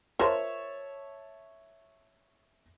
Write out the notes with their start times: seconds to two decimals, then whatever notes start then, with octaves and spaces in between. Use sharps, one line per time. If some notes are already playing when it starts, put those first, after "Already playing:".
0.19 F4 A#4 C5 C#5 E5 A5